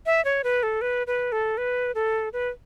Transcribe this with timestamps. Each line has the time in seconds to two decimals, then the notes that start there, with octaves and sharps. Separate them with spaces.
0.06 E5
0.25 C#5
0.44 B4
0.63 A4
0.82 B4
1.07 B4
1.32 A4
1.58 B4
1.95 A4
2.33 B4